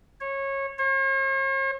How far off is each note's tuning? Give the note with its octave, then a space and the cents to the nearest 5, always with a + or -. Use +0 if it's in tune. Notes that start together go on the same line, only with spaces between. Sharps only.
C#5 -20
C#5 -45